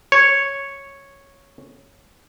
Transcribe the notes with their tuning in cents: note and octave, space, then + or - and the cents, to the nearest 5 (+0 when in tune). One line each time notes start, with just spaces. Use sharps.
C#5 -5